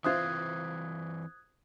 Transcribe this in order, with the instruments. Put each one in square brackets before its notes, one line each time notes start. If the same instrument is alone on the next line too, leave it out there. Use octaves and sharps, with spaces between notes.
[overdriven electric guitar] E3 C4 [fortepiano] F4 C5 E5 [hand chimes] D#6 F#6 G#6